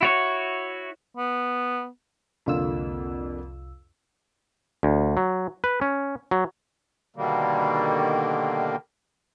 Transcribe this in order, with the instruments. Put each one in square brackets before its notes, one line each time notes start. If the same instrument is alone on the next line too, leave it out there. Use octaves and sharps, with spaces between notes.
[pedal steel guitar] E4 F#4 C#5
[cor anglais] B3
[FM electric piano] C2 F4 E6 [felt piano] F2 D3 A#3
[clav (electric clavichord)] D2
F#3
B4
C#4
F#3
[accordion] B2 D3 D#3 G3 A#3